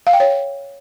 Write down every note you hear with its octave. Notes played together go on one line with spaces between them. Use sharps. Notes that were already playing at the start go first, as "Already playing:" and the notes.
F5
G5
C#5